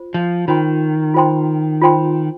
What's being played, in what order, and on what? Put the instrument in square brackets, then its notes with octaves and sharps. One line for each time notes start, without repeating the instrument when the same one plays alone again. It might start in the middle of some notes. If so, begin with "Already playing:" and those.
Already playing: [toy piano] F4 C5
[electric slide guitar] F3
[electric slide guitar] D#3 [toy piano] F4 C5 G5 C6
[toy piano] F4 C5 G5 C6
F4 C5 G5 C6